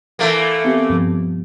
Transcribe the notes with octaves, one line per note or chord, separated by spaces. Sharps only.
E3 A3 A#3 A6
B3 C4 G4
G2 B2 F3